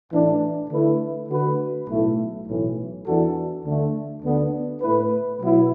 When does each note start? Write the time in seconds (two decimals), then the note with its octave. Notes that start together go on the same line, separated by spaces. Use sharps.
0.11 A1 A2 E3 D4
0.69 D3 A3 E4 B4
1.29 D3 A3 F#4 B4
1.87 B1 A2 A3 E4
2.46 B1 A2 E3
3.05 E2 E3 D4 F#4 A4
3.64 D2 D3 A3
4.22 D2 D3 B3 D4
4.81 A2 A3 E4 B4
5.40 B2 F#3 B3 E4